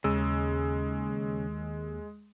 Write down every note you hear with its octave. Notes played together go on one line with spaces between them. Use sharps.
D#2 C#3 G#3 E6